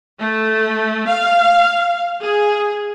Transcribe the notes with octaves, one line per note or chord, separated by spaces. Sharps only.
A3
F5
G#4